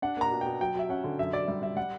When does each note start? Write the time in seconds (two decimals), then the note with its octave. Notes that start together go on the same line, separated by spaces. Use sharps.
0.02 D4 F#5
0.17 A#3 A#5
0.31 B2
0.41 B2 G5
0.61 F#3 G5
0.75 F#3 E5
0.89 C#4 F#5
1.04 D3
1.19 F#2 E5
1.33 F#2 D5
1.47 G3 E5
1.62 G3 E5
1.76 G3 F#5